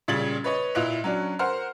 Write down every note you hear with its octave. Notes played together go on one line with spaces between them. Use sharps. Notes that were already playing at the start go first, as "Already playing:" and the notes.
A#2 C#3 G3 G#6 A6 F#7
B4 C#5 D#5
A#2 E4 D#5 F#6 F7
F#3 C#4 D4
A#4 C5 F#5 F6